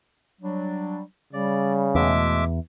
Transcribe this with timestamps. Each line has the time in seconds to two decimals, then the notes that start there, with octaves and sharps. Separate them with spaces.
0.41 F#3 G3 D4
1.33 C#3 G3 D5
1.95 E2 B2 G#3 A3 E5 D6